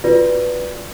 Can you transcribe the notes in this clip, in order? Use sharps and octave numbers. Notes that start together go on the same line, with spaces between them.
F4 F#4 B4 D5